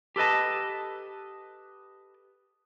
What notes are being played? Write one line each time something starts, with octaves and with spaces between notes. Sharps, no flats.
G4 A4 B4 D#5 A5